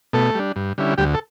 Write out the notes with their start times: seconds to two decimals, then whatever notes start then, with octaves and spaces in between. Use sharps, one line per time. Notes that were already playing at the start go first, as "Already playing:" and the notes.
0.13 B2 A3 A4
0.35 G3 D4
0.56 G2
0.78 D3 G3 C#4 E4
0.98 D2 G3 G4
1.14 A4